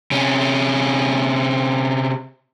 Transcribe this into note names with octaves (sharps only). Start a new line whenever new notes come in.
C3 C#4